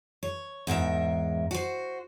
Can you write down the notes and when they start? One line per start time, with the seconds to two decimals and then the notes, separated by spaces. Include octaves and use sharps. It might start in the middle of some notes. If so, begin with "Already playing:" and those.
0.23 C#5
0.67 E2 G#2 A#4 E5
1.51 F#4 C5